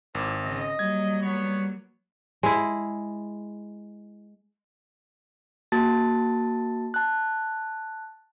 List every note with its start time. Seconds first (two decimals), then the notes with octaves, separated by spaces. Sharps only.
0.15 G#1 E4 A#4 D6
0.44 C#3 D#5 A#6
0.79 F#3 G3 A#3 G#6
1.21 B3 C#5
2.43 G#3 E4
5.72 A#3 F#4 A5 A6
6.94 A5 F#6